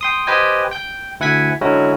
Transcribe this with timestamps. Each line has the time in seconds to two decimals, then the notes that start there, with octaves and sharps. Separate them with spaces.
0.01 G5 C6 D#6
0.27 G4 B4 C5 D#5 G5 G#5
0.71 G5 G6
1.20 D2 E4 F#5 G#5 G#6 B6
1.61 D3 F#3 G#3 C#4 E4 F#4